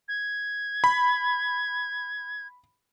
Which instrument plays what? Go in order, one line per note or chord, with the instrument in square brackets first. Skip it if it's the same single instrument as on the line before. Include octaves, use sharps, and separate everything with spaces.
[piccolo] G#6
[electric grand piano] B5